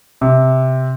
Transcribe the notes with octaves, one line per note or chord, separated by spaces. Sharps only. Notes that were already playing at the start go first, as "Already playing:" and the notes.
C3